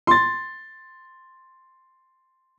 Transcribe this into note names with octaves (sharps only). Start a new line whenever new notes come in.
C6 A6